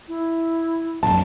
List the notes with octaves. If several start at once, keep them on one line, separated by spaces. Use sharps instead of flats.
E4
A#1 F#2 A5